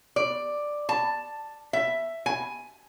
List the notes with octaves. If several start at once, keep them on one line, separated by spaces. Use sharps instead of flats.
D5
A5
E5
G#5